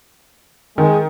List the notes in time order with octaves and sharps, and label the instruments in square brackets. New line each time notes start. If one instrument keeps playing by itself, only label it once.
[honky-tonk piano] D#3 [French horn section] G#3